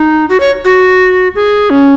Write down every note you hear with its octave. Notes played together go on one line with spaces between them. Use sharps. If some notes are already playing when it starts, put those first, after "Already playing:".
Already playing: D#4
F#4
C#5
F#4
G#4
C#4